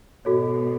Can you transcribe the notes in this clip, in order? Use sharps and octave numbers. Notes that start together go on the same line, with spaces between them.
G#2 B2 F#4 A4 C#5